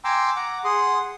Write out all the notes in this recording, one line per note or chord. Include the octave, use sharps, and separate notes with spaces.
G5 G#5 A#5 C6 D6 E6
F#5 A#5 D6
G#4 F#5 C6 D#6